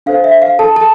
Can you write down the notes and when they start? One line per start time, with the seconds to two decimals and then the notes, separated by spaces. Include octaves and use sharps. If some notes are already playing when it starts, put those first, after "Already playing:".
0.06 D4 A4 C5 F5
0.24 E5
0.42 F5
0.59 A4 A5
0.76 A4 A5